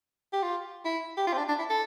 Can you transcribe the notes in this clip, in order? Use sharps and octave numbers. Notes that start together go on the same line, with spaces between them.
G4
F4
E4
G4
F4
C4
D4
D4
E4
A4